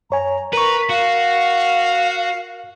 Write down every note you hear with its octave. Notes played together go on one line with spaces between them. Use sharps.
F#2 C#5 G#5 A#5
A#4 B4 A#5 C#6
F#4 F5